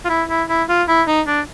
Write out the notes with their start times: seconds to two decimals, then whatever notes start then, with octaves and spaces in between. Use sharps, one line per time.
0.05 F4
0.09 E4
0.29 E4
0.49 E4
0.69 F4
0.88 E4
1.07 D#4
1.27 D4